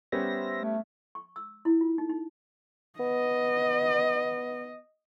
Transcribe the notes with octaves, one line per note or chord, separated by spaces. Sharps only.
G3 B3 C#4 C5 E5 A#6
A3
C#6
E6
E4
F4
D#4
D#4
B3 D#5